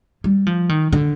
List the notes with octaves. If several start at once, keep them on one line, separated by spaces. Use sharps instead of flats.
G3
F3
D#3
D3